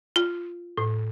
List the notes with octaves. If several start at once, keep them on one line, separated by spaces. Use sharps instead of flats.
F4
A2